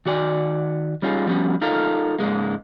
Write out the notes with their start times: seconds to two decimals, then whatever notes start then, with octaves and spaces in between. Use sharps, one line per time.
0.06 D#3 F#4 D5 G#5
1.02 G3 C#4 D#4 F4 G4 G#4
1.26 F3 G3 B3 C#4 F#4
1.61 D#4 F4 A4 A#4 D#5 F5
2.19 G#2 C#3 G#3 A#3